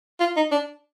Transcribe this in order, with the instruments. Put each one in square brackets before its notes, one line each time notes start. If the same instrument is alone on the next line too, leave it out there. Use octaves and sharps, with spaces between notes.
[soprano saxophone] F4
D#4
D4